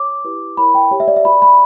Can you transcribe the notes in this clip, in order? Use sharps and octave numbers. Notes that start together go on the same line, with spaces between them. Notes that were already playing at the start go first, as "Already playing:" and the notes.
Already playing: F#4 C#5 D6
E4 G4 B4
E4 A#4 C#5 B5
G5
G4 C#5
E5
D5
E5
F#4 B4 D5 B5
B5